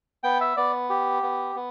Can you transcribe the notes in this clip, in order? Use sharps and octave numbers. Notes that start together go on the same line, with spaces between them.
B3 G5
E5
B3 D5
G4
B3
B3